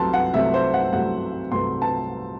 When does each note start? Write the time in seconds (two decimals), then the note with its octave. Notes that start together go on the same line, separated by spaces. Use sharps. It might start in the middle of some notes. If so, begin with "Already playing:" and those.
Already playing: C2 C3 F#3 A3 A5 C6
0.13 F#5
0.33 C2 C3 F#3 A3 E5
0.54 C5
0.74 F#5
0.92 C2 C3 F#3 A3 F#5
1.52 C2 C3 F#3 A3 C6
1.82 A5